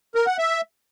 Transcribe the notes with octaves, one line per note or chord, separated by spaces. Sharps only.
A#4
F#5
E5